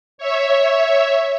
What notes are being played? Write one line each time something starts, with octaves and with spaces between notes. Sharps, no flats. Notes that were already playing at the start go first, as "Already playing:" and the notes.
C#5 E5